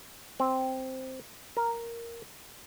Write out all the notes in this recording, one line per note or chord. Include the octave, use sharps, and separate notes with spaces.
C4
A#4